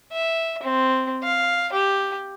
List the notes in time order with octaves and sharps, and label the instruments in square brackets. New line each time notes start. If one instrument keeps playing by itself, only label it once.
[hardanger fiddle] E5
C4
F5
G4